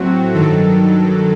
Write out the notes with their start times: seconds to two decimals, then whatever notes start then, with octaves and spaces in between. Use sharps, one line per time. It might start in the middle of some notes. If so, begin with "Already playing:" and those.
Already playing: A2 F#3 A3 C4 F#4
0.34 G2 D#3 F#3 A4